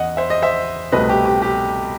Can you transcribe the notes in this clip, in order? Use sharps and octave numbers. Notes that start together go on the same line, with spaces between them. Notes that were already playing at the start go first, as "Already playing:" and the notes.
Already playing: E2 D#5 F#5
C5 E5
D#5
C5 E5
C2 B2 A3 C4 B4 D#5
G4
G4
G4